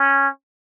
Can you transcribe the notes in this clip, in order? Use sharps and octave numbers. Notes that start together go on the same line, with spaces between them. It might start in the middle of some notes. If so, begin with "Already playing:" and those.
Already playing: C#4